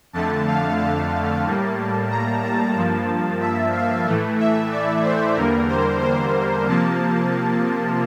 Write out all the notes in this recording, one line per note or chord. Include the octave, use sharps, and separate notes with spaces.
F2 D3 A3 A5
F5
A5
A2 G3 A#3
A#5
A5
G2 F3 A#3 A5
E5
F5
A2 E3 A3
E5
D5
C5
E2 D3 G3 A#3 A#4
C5
C5
C3 F3 A#3 A5